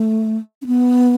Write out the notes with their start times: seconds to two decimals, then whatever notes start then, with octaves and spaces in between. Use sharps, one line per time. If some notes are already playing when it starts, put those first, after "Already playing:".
Already playing: A3
0.62 C#4
0.66 B3